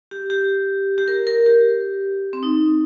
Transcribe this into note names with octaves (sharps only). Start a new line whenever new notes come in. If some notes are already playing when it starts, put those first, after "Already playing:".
G4
G4
G4
A#4
A#4
G4
C4
D#4